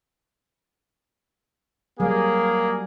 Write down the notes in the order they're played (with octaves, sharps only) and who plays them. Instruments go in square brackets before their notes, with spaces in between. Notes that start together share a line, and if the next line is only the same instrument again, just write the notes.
[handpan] F#3 G3 [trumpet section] A#3 G#4